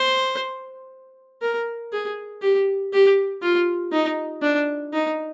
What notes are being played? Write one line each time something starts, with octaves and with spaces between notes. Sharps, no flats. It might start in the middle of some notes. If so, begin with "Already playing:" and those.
Already playing: C5
A#4
G#4
G4
G4
F4
D#4
D4
D#4